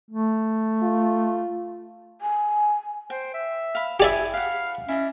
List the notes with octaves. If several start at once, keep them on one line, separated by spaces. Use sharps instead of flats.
A3
F4
G#5
C5 G5
E5
F5 B5
E4 G4 D5 E5 G5 G#5 D#6
B4 F5 F#5
C#4 E4 D5 D#5